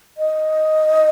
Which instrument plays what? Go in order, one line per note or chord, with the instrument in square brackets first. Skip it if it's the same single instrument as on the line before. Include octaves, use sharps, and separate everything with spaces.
[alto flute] D#5